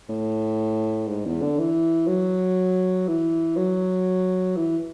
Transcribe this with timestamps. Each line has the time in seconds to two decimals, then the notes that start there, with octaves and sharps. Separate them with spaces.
0.09 A2
1.08 G#2
1.26 E2
1.42 D3
1.58 E3
2.07 F#3
3.08 E3
3.57 F#3
4.57 E3